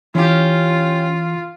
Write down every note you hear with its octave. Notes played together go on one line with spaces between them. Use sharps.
E3 C#4 F4 G4